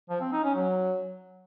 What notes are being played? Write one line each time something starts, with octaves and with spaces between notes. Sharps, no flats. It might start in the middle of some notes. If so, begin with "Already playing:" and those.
F3
C4
D#4
C#4
F#3